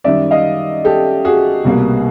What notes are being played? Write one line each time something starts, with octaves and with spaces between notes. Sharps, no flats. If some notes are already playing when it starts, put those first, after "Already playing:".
F#2 D#3 G3 D5 E5
D#5 F5
G4 A4
F#4 G#4
C2 B2 G3 A#3